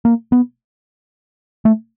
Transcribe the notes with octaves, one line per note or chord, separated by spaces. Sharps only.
A#3
B3
A3